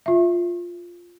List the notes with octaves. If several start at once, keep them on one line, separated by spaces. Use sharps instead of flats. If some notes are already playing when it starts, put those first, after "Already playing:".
F4 E5